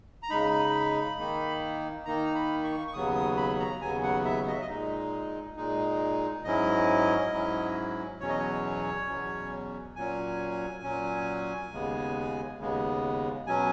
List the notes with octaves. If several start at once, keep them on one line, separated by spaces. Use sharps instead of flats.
A#5
C#3 G#3 D#4 B5
D#3 A#3 D#4
D#3 A#3 D#4 A#5
B5
C#6
C#6
D#2 C#3 F#3 B3 D#6
D#6
B5
A#5
D#2 C#3 F#3 B3 G#5
F#5
E5
D#5
E5
D#5
A#2 G#3 D#4
A#2 G#3 D#4
G#2 F#3 C#4 E4 D#5
G#2 F#3 C#4 E4
E2 B2 F#3 C#4 C#5
D#5
C#5
E2 B2 F#3 C#4
A#2 F#3 C#4 G#5
A#2 F#3 C#4
D#2 C#3 G#3 B3
D#2 C#3 G#3 B3
B2 F#3 C#4 G#5